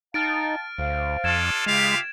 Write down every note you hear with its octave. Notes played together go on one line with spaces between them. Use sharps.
D#4 F5 G5 A5 F6 A6 D7
D2 C5 F5
F2 D4 F4 A4 G#6 A6 E7
C#3 G#3 A3 F4 G4 F5